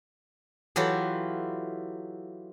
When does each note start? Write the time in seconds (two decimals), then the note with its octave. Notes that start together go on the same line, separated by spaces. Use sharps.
0.76 E3 F#3 E4 F4 G4 A4